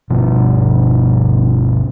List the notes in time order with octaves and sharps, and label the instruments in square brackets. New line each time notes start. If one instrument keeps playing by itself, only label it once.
[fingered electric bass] G1 B2 F3